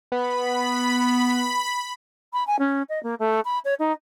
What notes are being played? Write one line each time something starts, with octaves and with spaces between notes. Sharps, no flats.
B3 B5
B5
G#5
C#4
D#5
A#3
A3
B5
C#5
D#4